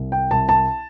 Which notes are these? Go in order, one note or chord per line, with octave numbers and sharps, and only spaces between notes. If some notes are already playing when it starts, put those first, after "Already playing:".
Already playing: C2
G5
C2 A5
A5